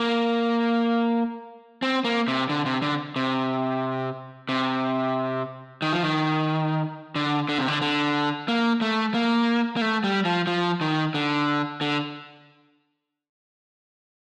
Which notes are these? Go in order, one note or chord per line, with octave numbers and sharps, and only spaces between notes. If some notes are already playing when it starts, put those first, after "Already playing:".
Already playing: A#3
C4
A#3
C3
D3
C3
D3
C3
C3
D#3
F3
D#3
D3
D3
C3
D3
D3
A#3
A3
A#3
A#3
A3
G3
F3
F3
D#3
D3
D3